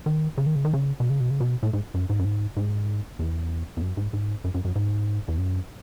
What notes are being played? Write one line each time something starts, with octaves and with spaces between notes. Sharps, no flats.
D#3
C#3
D#3
C#3
D#3
C#3
B2
C#3
B2
C#3
B2
A2
G#2
F#2
G#2
F#2
G#2
G#2
E2
E2
F#2
G#2
G#2
F#2
F#2
F#2
G#2
E2
F#2